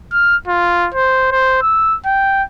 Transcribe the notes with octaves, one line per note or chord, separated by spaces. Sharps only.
F6
F4
C5
C5
E6
G5